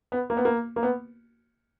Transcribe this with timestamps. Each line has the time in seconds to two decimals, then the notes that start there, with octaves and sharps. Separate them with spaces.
0.12 B3
0.30 A#3
0.37 B3
0.45 A#3
0.76 A#3
0.83 B3